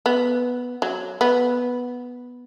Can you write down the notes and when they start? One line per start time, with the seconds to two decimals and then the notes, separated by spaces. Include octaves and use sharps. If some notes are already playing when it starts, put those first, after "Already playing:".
0.06 B3
0.82 F#3
1.21 B3